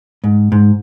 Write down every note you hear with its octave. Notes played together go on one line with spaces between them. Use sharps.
G#2
G#2